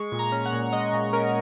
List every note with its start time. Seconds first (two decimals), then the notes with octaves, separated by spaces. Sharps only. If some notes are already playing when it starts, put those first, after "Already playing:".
Already playing: G#3 C#6
0.12 A#2
0.19 A#5
0.32 C#4
0.46 F#5
0.53 A#2
0.73 G#3 D#5
0.93 A#2
1.13 C#4 A#4